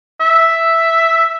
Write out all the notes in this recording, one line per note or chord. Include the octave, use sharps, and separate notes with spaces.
E5